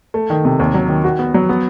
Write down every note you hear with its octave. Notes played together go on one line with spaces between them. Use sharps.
A3
D#3
C3
D#2
F#3
D#3
F#4
B3
F#3
B3